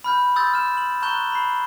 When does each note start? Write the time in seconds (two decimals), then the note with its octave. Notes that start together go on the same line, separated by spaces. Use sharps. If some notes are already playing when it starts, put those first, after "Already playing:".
0.04 B5 F6 G6
0.36 C6 D#6 E6 G6 A6
0.54 F6 E7
0.77 F#7
1.02 A#5 C#6 F#6 G6 E7 G7
1.32 B5 C7